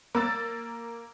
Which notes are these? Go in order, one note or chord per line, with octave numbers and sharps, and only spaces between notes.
A#3 E6 A6